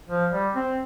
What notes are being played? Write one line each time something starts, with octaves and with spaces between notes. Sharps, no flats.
F3
G3
C4